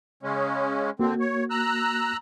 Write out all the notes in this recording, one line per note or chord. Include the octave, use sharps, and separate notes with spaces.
C#3 G#3 C#4
D3 A#3 C4 F#4
C#5
A#5 E6 F#6